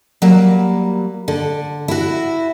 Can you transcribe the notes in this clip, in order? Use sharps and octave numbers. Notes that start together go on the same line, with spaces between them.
F#3 G3 A#3
D3
E4 F#4